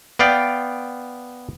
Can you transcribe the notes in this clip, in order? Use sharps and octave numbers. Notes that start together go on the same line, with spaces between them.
B3 D5 F5 G5